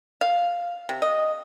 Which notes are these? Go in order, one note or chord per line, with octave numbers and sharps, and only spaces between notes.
F5
C3
D#5